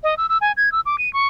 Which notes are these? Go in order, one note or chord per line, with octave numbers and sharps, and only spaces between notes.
D#5
E6
E6
G#5
G#6
E6
D6
D#7
C#6